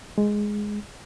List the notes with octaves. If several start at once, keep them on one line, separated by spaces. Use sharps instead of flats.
G#3